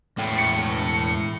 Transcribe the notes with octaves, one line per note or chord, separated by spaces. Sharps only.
E2 A2 G#3 G5
C#7